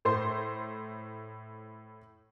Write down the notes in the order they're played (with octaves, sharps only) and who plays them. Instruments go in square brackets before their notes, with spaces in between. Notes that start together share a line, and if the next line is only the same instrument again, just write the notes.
[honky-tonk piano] A2 C5 C6